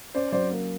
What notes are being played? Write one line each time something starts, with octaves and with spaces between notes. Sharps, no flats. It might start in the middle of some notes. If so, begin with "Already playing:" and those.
C#4 C5 D5
F#3 C5 D5
A#3